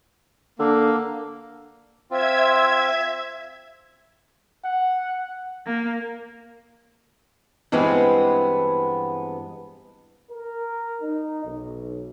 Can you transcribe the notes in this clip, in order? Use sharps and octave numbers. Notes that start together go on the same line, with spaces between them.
D3 A#3
C4 F4 E5 G#6
F#5
A#3
G2 E3 G#3 B3 C4
A#4
D#4
B1